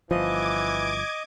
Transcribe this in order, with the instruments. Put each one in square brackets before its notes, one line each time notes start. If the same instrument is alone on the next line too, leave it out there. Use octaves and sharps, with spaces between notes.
[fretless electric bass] G1 F3 [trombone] E3 [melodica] D#5 [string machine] D6 G#6